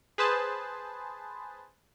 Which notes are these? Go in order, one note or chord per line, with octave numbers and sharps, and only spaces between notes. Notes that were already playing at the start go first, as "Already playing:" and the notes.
G#4 B4 C5 A5